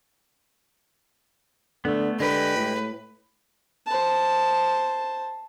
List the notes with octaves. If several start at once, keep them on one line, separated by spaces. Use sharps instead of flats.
D3 A3 B3
D3 G#3 G4 B4
A2
C5 A5